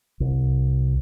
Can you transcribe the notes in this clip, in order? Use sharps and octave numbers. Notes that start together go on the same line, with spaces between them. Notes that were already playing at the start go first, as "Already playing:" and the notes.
C2